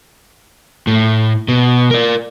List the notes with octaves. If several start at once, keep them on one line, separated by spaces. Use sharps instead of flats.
A2
B2
A#4 D5